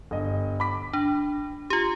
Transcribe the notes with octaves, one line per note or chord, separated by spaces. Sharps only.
G1 D#5
B5 D6 B6
D4
F4 G4